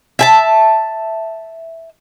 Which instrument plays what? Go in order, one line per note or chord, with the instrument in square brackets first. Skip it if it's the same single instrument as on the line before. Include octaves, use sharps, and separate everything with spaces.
[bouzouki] E5 G#5 A5